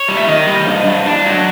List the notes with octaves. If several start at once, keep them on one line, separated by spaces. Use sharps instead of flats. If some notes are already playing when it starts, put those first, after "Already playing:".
Already playing: C#5
G3
E5
D#3 D#5
G3
G2
G2
D4
F#3